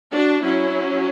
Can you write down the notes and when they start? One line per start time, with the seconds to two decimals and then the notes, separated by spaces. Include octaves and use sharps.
0.12 D4 F#4
0.42 F#3 C#4 E4